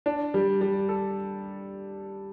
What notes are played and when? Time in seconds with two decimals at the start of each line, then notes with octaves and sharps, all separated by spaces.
0.06 D4
0.34 G3
0.61 G3
0.89 A4